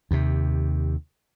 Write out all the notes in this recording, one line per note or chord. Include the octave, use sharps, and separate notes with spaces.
D#2 C3